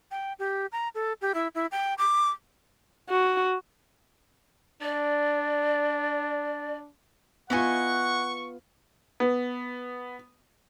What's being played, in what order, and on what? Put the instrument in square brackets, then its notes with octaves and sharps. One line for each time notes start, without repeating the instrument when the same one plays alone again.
[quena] G5
G4
A#5
A4
G4
E4
E4
G5
D6
[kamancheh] F#4
[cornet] D4 [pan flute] D5
[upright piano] B3 F4 [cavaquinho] E4 D#5 G#5 [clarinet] F#5 [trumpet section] C#6
[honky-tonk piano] B3